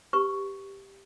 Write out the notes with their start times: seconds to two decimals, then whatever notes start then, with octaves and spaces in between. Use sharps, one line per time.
0.13 G4 B4 C#6